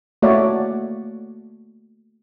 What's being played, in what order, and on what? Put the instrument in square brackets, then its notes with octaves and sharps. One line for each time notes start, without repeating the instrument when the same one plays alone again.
[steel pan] A3 A#3 F#4 C#5 D5 E5